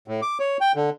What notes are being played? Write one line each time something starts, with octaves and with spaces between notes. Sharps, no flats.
A2
D6
C#5
G5
D3